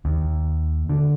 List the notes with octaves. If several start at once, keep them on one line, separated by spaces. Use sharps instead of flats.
D#2
D3